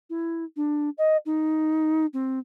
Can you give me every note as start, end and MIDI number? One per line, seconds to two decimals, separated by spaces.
0.10 0.44 64
0.56 0.90 62
0.98 1.17 75
1.26 2.06 63
2.13 2.39 60